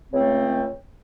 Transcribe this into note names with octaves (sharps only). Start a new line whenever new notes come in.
C#2 C#3 A3 C4